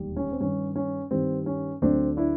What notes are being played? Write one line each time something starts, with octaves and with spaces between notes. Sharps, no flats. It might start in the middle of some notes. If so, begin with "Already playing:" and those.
Already playing: E1 D#2 D#3 G3
C#4
C4
G2 D#3 G3 C#4
C#4
G2 D#3 G3 C4
C#4
D2 D3 F#3 A3 C4 D4
D4 E4